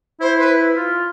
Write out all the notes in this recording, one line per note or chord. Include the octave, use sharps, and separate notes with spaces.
E4 C5
B4
F4